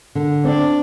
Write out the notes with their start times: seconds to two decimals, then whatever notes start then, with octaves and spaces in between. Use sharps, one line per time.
0.15 D3
0.44 C4 D4